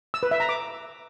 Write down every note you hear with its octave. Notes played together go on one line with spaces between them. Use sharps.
E6
B4
E5
A#5
D6